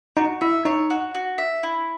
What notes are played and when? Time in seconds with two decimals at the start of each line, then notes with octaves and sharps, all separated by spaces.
0.17 D#4 F#4
0.41 E4 E5
0.65 D#4 C#5
0.90 F#4
1.15 F#4
1.38 E5
1.63 E4